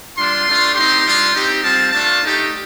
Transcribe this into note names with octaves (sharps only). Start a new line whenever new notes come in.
G3 D4 F4 C6
A3 D4 F4
C4 D#4 G4 C6
G3 D4 F4
C4 D#4 G4
G3 C4 F4 A5
A3 D4 F4 A5
A3 D#4 G4